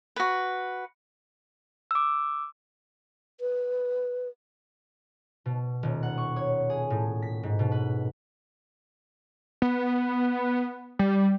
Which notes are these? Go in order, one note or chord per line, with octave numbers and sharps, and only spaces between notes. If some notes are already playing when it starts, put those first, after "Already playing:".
F#4 B4
D6 E6
B4
B2
D#1
F#5
C#6
C#5
G#4
A2
B6
G#2
B2
B4
B3
G3